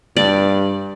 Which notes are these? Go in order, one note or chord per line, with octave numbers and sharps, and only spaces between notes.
G2 D5